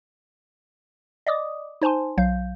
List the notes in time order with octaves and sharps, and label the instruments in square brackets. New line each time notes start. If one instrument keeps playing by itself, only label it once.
[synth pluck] D5 D#5 D6 D#6
D#4 C5 G#5 A5 C6
B1 F#3 F5 G6